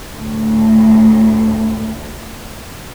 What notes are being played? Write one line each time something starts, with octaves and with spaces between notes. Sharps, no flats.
D2 A2